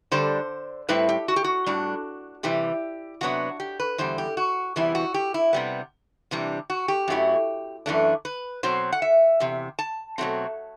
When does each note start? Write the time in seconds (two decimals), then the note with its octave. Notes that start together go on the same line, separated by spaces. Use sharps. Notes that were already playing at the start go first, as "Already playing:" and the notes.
0.11 D3 G3 D4 C5
0.89 A2 G3 C4 E4 B4
1.09 G4
1.28 F#4
1.36 G4
1.44 F#4
1.66 A2 G3 D4
2.43 C3 E3 G3 G4
3.21 C3 F#3 B3 D4 F#4
3.60 G4
3.80 B4
3.98 E2 D3 G3 C5
4.18 G4
4.37 F#4
4.76 E2 C3 E3 G3 E4
4.95 F#4
5.14 G4
5.34 E4
5.53 C3 G3 B3
6.31 C3 E3 G3 D4
6.70 F#4
6.88 G4
7.08 F#2 F#3 A3 E4
7.86 F#2 E3 A3 D4
8.25 B4
8.63 B2 F#3 C4 C5
8.92 F#5
9.02 E5
9.40 E2 C3
9.79 A5
10.18 B2 F#3 A3 C4